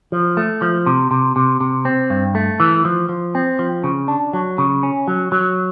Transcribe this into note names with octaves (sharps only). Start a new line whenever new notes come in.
F3
A3
F3
C3
C3
C3
C3
C4
G2
A3
E3
F3
F3
C4
F3
C#3
D4
F#3
C#3
C#4
F#3
F#3